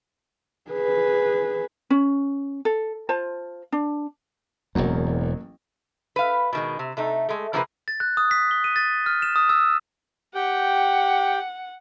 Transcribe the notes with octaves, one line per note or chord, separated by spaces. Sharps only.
G#4 B4
C#4
A4
F4 C5 A5
D4
E1 A1 E2 F#3 A#3
B4 F5
B2 D#3 G#3
C3
C3 A3 D#4
G#3 A3
C3 F3 A#3 G#4 A#4 B4
A6
F#6
D#6
B6
G7
D#7
A6
F6
E7
D#6
E6
G4 F#5 G5